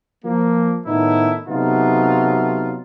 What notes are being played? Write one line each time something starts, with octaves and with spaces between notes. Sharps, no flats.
F3 A#3
A2 D#3 A3 B3 D#4 E4
C3 F#3 A3 B3 D#4 F4